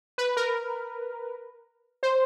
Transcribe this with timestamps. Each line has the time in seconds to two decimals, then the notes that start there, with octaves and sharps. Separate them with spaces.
0.18 B4
0.37 A#4
2.03 C5